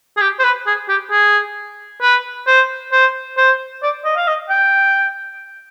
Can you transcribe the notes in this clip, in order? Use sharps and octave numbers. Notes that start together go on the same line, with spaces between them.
G#4
G4
C5
B4
G#4
G4
G#4
B4
C5
C5
C5
D5
D#5
F5
D#5
G5